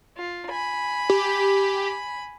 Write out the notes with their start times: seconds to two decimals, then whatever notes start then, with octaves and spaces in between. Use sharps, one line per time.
0.17 F4
0.50 G#5 B5
1.10 G4